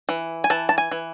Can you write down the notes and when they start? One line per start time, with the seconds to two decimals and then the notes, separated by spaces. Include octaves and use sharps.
0.09 E3
0.44 G#5
0.50 E3 A5
0.69 A5
0.78 G#5
0.91 E3